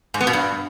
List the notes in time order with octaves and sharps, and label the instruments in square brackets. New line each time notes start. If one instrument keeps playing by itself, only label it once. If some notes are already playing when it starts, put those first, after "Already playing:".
[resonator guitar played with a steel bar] G#2
B3
B2
G2